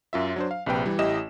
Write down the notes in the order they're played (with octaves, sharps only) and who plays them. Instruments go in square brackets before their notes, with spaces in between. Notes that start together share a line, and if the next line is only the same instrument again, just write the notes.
[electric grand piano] F#2 F4 E5
F#3 D4 C5
F5
A#1 C3 B4 G5
E3 G3
A1 E4 G4 D#5 E7